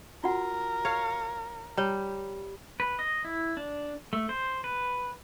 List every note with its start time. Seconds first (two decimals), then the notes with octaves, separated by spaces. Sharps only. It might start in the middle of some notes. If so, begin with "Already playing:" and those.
0.24 F4 F#4 A#4 F#5
0.85 C#5 F5
1.77 G3 C#5 A#5
2.80 B4
2.99 D#5
3.25 E4
3.57 D4
4.13 A3
4.29 C5
4.64 B4